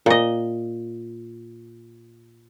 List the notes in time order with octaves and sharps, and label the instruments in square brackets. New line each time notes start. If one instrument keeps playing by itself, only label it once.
[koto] A#2 D#5